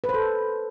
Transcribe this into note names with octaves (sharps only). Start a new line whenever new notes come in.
B4
C5
A4